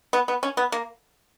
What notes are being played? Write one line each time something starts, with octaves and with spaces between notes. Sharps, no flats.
B3
B3
C#4
B3
A#3